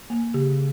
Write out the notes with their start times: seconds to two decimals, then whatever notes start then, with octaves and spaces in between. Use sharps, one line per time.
0.10 A#3
0.34 C#3 G4